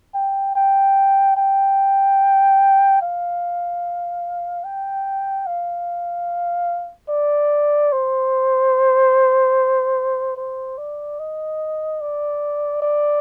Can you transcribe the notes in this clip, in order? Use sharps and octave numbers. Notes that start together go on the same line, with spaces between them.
G5
G5
G5
F5
G5
F5
D5
C5
C5
D5
D#5
D5
D5